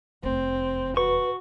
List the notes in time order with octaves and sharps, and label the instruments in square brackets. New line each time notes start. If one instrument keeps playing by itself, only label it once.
[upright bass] F1 E2 [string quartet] C4
[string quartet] F#4 [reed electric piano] B4 [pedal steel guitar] C#6